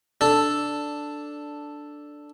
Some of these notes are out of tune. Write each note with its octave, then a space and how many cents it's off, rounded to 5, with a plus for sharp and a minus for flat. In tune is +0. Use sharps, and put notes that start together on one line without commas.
D4 +0 A4 +0